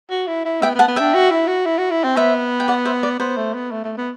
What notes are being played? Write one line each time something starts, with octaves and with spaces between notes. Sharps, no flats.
F#4
E4
E4
B3 E5 G5
B3
F#5 A5
B3
D4 E5 G5
F#4
E4
F#4
E4
F#4
E4
C4
B3 C5 E5
G5
D5 F#5
C5 E5
D5
B3 C5
A3
B3
A3
A3
B3